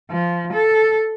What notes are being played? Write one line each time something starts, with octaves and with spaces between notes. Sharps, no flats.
F3
A4